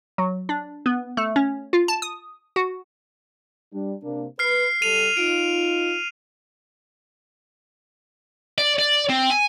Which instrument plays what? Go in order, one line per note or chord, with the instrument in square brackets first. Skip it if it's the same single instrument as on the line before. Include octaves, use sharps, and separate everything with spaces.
[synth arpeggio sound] F#3
D4
B3
A3
C#4
F4
A5
D#6
F#4
[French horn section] G3 D4
C3 A#3 D4
[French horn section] B4 [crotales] F6 C7
[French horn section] G3 A4 [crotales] D#7 F7
[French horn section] D#4 F4 [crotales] D7
[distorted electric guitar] D5
D5
C4
G#5